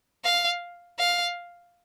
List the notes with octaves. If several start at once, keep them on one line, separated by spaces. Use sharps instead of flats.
F5
F5